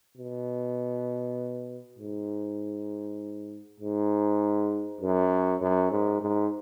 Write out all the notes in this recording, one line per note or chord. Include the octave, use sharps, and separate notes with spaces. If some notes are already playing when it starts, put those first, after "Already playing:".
B2
G#2
G#2
F#2
F#2
G#2
G#2